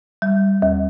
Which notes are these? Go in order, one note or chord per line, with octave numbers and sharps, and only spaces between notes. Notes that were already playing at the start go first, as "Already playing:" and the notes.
G3
D#2